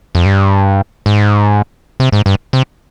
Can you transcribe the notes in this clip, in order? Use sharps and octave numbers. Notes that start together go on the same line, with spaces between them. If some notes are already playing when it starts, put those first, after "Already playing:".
F2
G2
G#2
C3
G#2
G2
C3